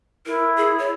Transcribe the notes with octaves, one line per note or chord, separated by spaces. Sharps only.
E4 A#4
G#4
C#5